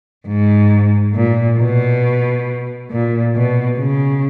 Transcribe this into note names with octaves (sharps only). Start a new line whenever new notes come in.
G#2
A#2
B2
A#2
B2
C#3